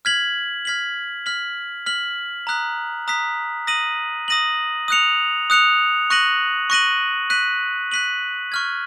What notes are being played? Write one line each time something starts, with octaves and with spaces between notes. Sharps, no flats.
F6 G#6 B6 F#7
F6 G#6 B6 F#7
F6 B6 F#7
F6 B6 F#7
A#5 D#6 F#6 B6
A#5 D#6 F#6 B6
D#6 A#6 D#7 F#7
D#6 A#6 D#7 F#7
D#6 F#6 C#7 F7
D#6 F#6 C#7 F7
C#6 F#6 A#6 D#7 F#7
C#6 F#6 A#6 D#7 F#7
F#6 B6 D#7 F#7
F#6 B6 D#7 F#7
C#6 F6 G#6